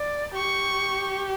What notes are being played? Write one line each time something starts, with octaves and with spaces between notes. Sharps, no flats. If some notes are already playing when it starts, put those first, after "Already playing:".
Already playing: D5
G4 C#6